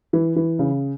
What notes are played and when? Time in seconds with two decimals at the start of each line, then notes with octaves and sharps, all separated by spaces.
0.13 E3
0.36 E3
0.59 C#3